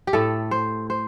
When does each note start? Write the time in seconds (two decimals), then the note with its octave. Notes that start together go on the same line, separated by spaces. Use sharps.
0.07 G4
0.13 A2 A3 A4
0.51 C5
0.90 C5